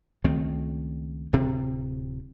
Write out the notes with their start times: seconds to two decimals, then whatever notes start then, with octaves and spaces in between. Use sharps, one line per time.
0.24 C#2 D#3 A3 C4
1.33 D1 C3 C4